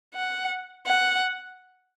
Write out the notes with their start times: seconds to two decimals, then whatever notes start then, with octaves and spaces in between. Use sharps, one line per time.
0.14 F#5
0.86 F#5